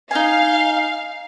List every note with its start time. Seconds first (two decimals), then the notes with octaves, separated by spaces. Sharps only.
0.11 D#4 F5 G#5